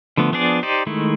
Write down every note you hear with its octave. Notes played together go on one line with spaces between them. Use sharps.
D3 F3 A3 B3
F3 B3 D4 G#4 D5
D#4 G4 C5 D5 D#5
D#3 G#3 A3 E4